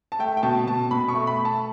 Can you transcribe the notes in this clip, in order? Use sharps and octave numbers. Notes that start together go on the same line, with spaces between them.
A5
A3 G5
G5
B2 A5
B2 A5
B2 B5
C#6
A3
B5
A3
A5